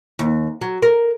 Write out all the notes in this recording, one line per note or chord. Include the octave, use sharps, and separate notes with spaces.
D#2
F#3
A#4